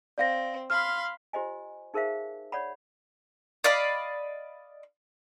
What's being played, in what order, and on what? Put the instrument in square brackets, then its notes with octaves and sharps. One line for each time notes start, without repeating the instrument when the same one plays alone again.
[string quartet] C4 [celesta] D5 F5 A#6
[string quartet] F5 B5 C6 [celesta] F6
[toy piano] F4 G4 C5 D#5 G#5
D#4 G#4 A#4 C5 E5 F5
C#5 D5 F#5 B5
[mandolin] D5 D#5 F5 B5